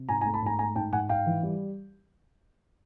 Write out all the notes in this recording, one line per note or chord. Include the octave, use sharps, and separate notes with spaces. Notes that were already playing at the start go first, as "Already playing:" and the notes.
Already playing: C3
G#2 G#5 A#5
G#5 A#5
A3
A5 B5
G#2 G#5 A#5
A3 G#5 A#5
G#2 G5 A5
G#2 F#5 G#5
G#2 F5 G5
E3
G3